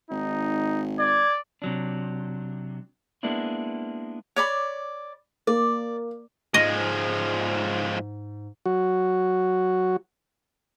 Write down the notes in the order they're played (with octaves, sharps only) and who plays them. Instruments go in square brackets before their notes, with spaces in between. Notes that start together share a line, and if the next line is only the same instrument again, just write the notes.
[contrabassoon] G#1 [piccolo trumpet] D#4
[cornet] D5 [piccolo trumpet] G#6
[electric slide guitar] C3 F#3 D4
G#3 A#3 B3 D4 E4
[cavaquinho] C#5 D5 B5
[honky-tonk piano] A#3 [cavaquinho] D5
[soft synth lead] G#2 [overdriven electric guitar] F3 G#3 [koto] D#5
[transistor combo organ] F#3 F#4